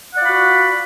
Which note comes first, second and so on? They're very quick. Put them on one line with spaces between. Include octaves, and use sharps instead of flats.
F#5 D5 F4 B5 F#4